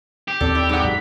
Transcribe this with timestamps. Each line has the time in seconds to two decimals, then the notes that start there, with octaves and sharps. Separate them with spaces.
0.28 G4
0.41 D#2 C4 A4 D5
0.55 E4
0.69 G#2 F#5
0.84 F#2 B6